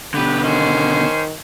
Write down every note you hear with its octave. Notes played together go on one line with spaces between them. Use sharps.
B2 D3 G4 B4
D#3 C#4 C5